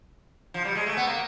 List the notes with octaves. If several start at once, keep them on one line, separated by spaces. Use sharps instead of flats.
F3
G3
G#3
A3
B3
A#3